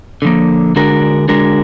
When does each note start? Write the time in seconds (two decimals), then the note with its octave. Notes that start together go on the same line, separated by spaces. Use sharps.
0.22 D3 F3 A#3
0.76 D3 G#3 D4 F#4 A#4
1.28 D3 G#3 D4 F#4 A#4